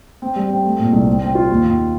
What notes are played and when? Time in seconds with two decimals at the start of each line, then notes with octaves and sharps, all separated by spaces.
0.22 C4
0.36 G3
0.50 C4
0.64 A3
0.79 A#2
0.93 C2
1.08 C4
1.22 C4
1.35 F4
1.50 D#2
1.65 D#2